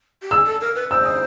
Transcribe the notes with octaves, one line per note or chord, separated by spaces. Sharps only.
G4
G#4 E6
A4
A#4
B4
C5 E6
D#6